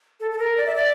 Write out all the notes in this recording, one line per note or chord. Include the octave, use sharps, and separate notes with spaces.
A4
A4
A#4
D5
E5
D5